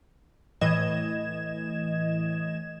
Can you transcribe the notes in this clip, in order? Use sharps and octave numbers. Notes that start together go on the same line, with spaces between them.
A2 E3 D#5 G#6 E7